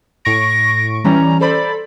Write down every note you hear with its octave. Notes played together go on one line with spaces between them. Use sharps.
A2 C#6 A#6 D7
E3 G3 C#4 A#5
A4 C5 D5 B5